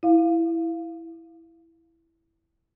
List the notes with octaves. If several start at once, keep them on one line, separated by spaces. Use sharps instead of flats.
E4 F5